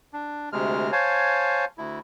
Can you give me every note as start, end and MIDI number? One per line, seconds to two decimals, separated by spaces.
0.13 0.49 62
0.53 0.91 38
0.53 0.91 48
0.53 0.91 56
0.53 0.91 89
0.92 1.65 72
0.92 1.65 73
0.92 1.65 77
0.92 1.65 80
0.92 1.65 81
1.78 1.99 38
1.78 1.99 64